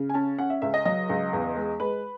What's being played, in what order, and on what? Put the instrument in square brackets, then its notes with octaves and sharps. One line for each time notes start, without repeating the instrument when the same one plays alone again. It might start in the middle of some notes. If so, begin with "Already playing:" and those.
Already playing: [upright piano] C#3
G#5
C#4 A5
C#4 F#5
E5
C#2 E5
D#5
F#3 D#5
C#2
E2
G#3
G#3 B4